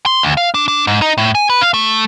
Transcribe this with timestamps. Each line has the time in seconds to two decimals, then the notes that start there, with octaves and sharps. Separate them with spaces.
0.06 C6
0.23 D2
0.37 F5
0.54 D4
0.68 D4
0.87 G#2
1.02 D#4
1.18 A2
1.35 G#5
1.50 B4
1.61 F5
1.74 A3